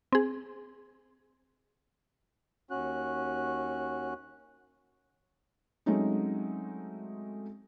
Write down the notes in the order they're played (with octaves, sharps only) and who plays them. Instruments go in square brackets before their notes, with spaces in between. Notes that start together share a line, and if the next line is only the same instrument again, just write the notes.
[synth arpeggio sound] C4 G#4
[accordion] D#2 C#4 F#4 F#6
[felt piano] F#3 G#3 A3 C4 C#4 D#4